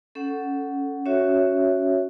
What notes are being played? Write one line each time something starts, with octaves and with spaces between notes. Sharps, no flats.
C#4 A4 F#5
C#4 F#4 C#5 E5